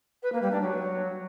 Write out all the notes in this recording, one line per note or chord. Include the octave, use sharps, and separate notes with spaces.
B4
A#3
G3
D4
F#3